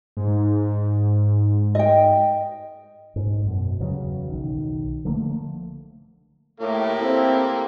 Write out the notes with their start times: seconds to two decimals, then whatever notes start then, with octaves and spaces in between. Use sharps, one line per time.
0.17 G#2
1.75 D#5 G5
3.16 G#2
3.46 F#2 B2
3.80 E2 C#3 F#3
4.29 B1 D#3
5.05 D3 F3 A3 A#3
6.60 A2 A#3 G4
7.00 C4 E4 A4